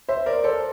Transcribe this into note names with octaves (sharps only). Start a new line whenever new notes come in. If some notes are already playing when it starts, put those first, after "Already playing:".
C5 E5
A#4 D5
A4 C5